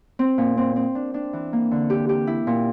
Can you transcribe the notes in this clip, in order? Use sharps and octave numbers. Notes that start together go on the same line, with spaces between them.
C4
A#2
C4
C4
D4
D4
E3
A#3
D3
G4
G4
E4
A#2